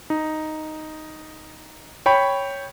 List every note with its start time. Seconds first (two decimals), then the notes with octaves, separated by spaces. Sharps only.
0.10 D#4
2.06 C#5 G5 B5 C#6